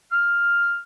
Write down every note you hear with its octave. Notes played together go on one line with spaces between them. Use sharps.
F6